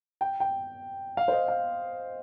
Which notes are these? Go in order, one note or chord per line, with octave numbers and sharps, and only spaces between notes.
G5
G5
F5
C5
D#5
F5